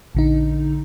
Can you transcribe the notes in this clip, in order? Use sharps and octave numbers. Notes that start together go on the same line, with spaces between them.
A#1 D3 D#4